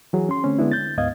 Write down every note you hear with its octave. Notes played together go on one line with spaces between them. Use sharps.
E3 F#3 G#4
C#4 C6
D3 A3 C4 C#4
D3 G#3 B3 D4 E4
G6 A6
D2 G#2 B3 D#5 F5 G#6